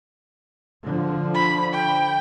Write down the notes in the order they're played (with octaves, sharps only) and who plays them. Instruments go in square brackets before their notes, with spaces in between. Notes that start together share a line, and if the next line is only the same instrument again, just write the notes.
[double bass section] D3 F3
[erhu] B5
G5